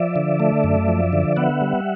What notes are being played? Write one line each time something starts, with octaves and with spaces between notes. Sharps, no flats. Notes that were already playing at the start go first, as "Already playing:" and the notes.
Already playing: F3 D5 E5
D3
A3
F#2
F3
D3
B3 E5 F#5
G3